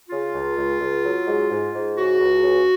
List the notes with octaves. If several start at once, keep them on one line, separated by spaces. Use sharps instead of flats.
C#3 F4
C#2
C#2
C#2
F#3
G#2
G#2
G#2
C#3 F#4
C#2
C#3